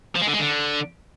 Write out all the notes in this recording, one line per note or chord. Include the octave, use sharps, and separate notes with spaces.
F3
G#3
D3
G#3
D3